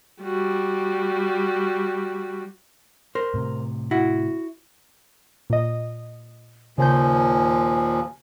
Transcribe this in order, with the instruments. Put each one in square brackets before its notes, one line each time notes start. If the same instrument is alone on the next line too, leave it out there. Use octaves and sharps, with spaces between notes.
[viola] G3 F#4
[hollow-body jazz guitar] A#4 C5
[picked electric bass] A2 C3
[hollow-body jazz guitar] E4 F#4
[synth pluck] A#2 D#5
[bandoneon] D#2 A#2 F3 [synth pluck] C#3 G6 [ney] G#5